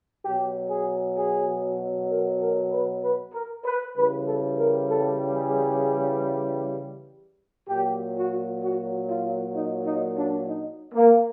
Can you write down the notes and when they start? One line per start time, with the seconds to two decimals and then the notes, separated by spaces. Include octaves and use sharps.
0.23 B2 F#3 G4
0.70 G#4
1.17 G#4
2.10 A#4
2.41 A#4
2.72 B4
3.03 B4
3.34 A#4
3.65 B4
3.96 C#3 E3 G3 B4
4.27 A4
4.58 A#4
4.88 A4
5.35 G#4
7.68 A#2 F#3 G4
8.15 F#4
8.61 F#4
9.08 F4
9.54 D#4
9.86 D#4
10.17 D4
10.47 D#4
10.94 A#3